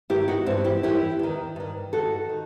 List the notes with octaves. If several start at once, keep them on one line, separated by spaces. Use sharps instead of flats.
G2 D#3 E4 G4
D#4 F#4
G2 E3 C4 E4
E4 G4
F#2 E3 E4 G4
E2 D#3
G2 D#3
G2 D#3 F#4 A4
D#3